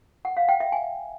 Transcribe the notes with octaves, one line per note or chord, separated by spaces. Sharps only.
F#5
F5
G5
E5
G#5